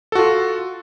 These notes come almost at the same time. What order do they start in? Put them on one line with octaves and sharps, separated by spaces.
A4 F#4 F4